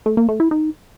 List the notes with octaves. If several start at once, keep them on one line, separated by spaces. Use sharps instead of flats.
A3
A#3
A3
E4
D#4